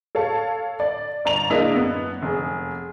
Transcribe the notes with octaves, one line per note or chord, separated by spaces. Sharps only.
A4 C#5 F5 A5
D5
G1 D5 A#5 F7
G#3 A#3 D4 E4 D#5 E5
F#2 B3
F1 G#4